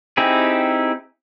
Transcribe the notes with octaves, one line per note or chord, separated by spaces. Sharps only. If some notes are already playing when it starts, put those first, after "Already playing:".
C4 D#4 E4 G4 G#4